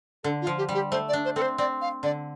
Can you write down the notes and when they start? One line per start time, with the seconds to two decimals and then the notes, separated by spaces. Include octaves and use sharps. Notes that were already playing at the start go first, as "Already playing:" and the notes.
0.24 D3 A4
0.42 F4
0.47 F3
0.58 G4
0.69 G3
0.74 G4
0.91 A3 C5
1.09 D5
1.13 D4
1.25 C5
1.36 C4 A4
1.42 C5
1.58 C4 D5
1.81 F5
2.03 D3 D5